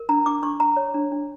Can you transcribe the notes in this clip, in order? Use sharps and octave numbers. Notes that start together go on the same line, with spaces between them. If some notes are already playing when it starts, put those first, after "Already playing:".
Already playing: A#4
D4 A#5
D4 D6
D4 C#6
D4 A#5
C#5
D4
D4